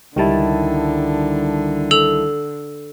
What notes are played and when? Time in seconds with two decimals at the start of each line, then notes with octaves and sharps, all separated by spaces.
0.16 C#2 D3 D#3 G3 E4 A5
1.91 A4 E6 F7